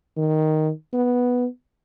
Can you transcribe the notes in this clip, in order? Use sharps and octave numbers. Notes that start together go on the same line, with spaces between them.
D#3
B3